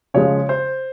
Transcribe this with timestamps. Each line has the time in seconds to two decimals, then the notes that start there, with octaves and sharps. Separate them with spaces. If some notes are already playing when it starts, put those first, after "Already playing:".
0.14 C#3 F3 G#3 C#5
0.49 C5